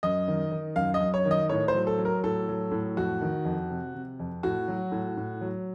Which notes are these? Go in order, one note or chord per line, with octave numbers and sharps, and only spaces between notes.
F#2 D#5
D#3
D#3
F#2 F5
D#5
F#2
C#5
D#3
D#5
A2 C#5
C5
F#3
A4
F#3
A#4
A2 A4
F#3
A2
F2 F#4
D#3
F2
C3
C3
F2
A2 F#4
F#3
A2
A2
F#3